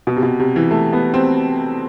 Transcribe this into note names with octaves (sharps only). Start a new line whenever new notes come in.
B2
C3
B2
C3
E3
A3
B3
C4